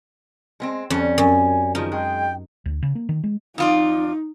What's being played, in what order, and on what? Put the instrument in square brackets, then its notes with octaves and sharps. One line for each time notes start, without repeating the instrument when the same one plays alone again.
[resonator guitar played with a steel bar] G#3 B3 C4
[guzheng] F2 [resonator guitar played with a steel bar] G3 C#4
[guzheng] F#2 [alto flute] G#5
[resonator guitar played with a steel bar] D#3 F3 [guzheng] D#4 [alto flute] G#4
[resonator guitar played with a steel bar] G#3 [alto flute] G5
[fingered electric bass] D2
C#3
A#3
D#3
G#3
[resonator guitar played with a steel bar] F2 F4 D5 [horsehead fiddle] D#4